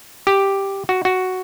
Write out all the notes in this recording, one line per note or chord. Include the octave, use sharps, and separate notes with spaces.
G4
F#4
F#4